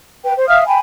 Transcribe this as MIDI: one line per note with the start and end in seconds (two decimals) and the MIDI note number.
0.23 0.32 71
0.23 0.32 79
0.36 0.47 72
0.47 0.63 76
0.47 0.63 77
0.47 0.63 87
0.47 0.63 89
0.66 0.79 79
0.66 0.79 80
0.66 0.79 83